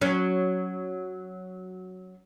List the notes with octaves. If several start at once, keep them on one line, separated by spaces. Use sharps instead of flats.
F#3 C#4